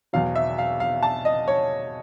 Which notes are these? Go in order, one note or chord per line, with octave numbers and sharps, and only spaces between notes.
E2 B2 F#3 F5
E5
F5
F5
A5
D#5
C#5